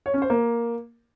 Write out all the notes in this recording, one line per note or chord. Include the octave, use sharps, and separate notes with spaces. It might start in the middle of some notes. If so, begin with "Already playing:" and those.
C#5
C#4
C5
A#3